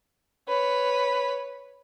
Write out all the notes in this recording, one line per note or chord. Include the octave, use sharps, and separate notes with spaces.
B4 C#5